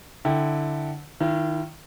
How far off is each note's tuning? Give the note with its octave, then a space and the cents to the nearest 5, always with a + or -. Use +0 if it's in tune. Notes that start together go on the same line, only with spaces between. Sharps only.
D3 +0 E4 -15 G5 +0
D#3 +0 E4 +40